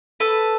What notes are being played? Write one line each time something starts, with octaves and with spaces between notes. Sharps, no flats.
A4 B4